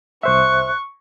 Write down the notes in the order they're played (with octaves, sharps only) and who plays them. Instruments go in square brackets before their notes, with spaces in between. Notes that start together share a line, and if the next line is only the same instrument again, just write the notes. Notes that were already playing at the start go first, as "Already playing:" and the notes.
[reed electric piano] C2 C5 E5 [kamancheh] C#6 [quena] F#6